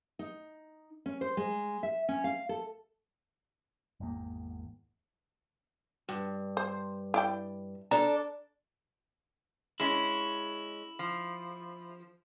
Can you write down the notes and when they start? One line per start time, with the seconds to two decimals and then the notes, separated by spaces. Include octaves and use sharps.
0.19 D#4
1.06 C#4
1.21 C5
1.37 G#3
1.83 E5
2.09 C#4
2.24 F5
2.49 A4
4.00 G#1 E2 G#2 A#3
6.09 G2
6.57 C5
7.14 E4 D5 G5
7.91 D4 A4 A#5
9.80 G#3 C#4 E4
10.99 F3